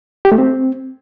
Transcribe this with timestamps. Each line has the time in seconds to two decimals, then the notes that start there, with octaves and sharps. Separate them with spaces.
0.25 G4
0.32 A3
0.38 C4